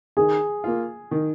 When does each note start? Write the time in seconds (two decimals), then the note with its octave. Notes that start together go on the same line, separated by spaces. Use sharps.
0.17 D#3 G#4
0.64 A#3 F4
1.11 D#3